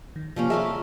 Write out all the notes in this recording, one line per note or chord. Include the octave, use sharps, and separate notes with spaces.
D#3
C3 F3 G3 A#3 C#4
G3 A3 F4 G#4 A#4 E5